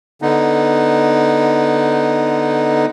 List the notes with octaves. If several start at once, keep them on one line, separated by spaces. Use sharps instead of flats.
D3 B3 D#4